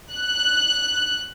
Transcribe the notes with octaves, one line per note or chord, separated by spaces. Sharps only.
F#6